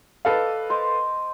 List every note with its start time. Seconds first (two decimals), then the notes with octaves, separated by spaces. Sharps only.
0.25 A4 B4 D5 D#5 F5
0.70 C5 D#5 D6